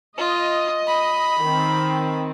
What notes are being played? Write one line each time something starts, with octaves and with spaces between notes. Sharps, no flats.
F4 D#5
B5
D#3 C4